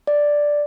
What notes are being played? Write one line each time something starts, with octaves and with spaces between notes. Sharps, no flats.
D5